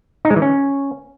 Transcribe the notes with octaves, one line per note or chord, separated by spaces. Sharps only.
D#4
G#3
E3
C#4